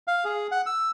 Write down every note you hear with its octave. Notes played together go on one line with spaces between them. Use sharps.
F5
G#4
F#5
E6